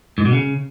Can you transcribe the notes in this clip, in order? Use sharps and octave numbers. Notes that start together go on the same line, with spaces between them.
G#2
B2
C#3